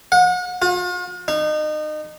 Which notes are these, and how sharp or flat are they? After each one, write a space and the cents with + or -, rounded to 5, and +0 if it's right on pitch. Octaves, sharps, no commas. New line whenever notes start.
F#5 -35
F4 +45
D#4 -30